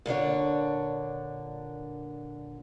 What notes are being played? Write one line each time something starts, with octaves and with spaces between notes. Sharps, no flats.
A#2 D3 D4 C#5